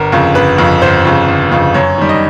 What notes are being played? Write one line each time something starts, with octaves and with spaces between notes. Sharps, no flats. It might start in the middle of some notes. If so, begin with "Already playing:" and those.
Already playing: G1 A#4
F2 C#3
G1 B4
F2 C#3
G1 C5
F2 C#3
G1
F2 C#3
F#2 C#5
D#3 G3
D#5